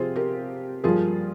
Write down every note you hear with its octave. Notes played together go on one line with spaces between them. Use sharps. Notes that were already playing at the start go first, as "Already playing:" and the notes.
Already playing: C3 F3 F4 G#4 C5
G4 A#4
G2 F3 A#3 F4 G#4